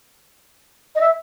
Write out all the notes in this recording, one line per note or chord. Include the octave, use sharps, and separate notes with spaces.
D#5
E5